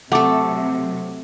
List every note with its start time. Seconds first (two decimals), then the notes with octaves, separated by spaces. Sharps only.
0.12 C3 F#3 A3 A4 F#5 D6